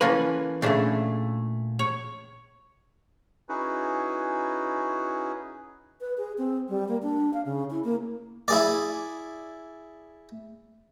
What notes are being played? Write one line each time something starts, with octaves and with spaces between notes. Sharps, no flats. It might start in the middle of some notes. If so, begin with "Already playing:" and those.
E3 A#3 C#4 F4 A4 B4
A#2 C#3 A3 D4 E4
C#5
C#4 D#4 E4 F#4 G#4 B4
B4
G#4
C4
G3
A#3
D4
F5
C#3
E4
A#3
E4 G#4 D5